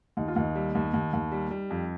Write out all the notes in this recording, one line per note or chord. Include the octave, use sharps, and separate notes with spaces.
D#2 D#4
F4
D#2 D#4
G3
D#2
D#2
D#2
G3
G3
F2